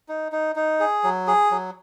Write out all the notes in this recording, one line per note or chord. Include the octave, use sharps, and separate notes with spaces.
D#4
D#4
D#4
G#4
F#3
G#4
F#3